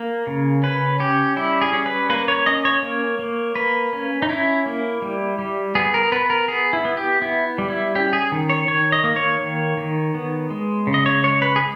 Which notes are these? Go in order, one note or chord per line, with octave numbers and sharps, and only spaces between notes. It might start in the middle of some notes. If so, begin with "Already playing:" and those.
Already playing: A#3 A#4
C#3
C#4 B4
C#4 G4
G3 E4
G#4
C#4
B4
A#3 B4
C#5
C#4 D#5
C#5
A#3
A#3
A#3 B4
C#4
D#4
C#4 E4
A#3
G3
G3
B3 G#4
A#4
B3 B4
A#4
B3 G#4
E4
B3
G4
B3 E4
G3
E4
C#4 G4
G#4
D#3
C#5
D#3 C#5
D#5
A#3
C#5
D#3
D#3
B3
G#3
C#3
D#5
C#5
G#3 C#5
B4
G#4